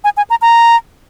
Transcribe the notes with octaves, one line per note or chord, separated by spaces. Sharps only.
G#5
G#5
A#5
A#5